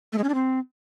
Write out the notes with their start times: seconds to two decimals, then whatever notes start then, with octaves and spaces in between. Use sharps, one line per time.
0.13 A3
0.18 G#3
0.24 C#4
0.29 D4
0.34 C4